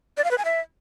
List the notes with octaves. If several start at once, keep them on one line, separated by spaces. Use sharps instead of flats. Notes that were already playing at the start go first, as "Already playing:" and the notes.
D5
F5
B4
G#5
E5